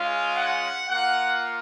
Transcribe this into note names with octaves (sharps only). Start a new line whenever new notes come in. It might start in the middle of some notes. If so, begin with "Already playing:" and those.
Already playing: G#3 C#4 F4 F5
F#5
A#3 F4 F#5